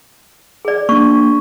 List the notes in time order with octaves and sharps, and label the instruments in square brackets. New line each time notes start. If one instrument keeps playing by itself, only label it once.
[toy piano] G#4 D5
[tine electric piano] A#3 D4 [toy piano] C#6